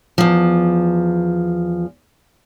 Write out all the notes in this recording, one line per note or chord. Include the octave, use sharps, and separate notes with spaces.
E2 F3